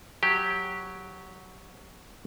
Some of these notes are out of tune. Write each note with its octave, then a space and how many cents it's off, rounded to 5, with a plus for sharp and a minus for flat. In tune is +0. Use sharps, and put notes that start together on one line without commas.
F#3 +0 G4 +0 G5 +0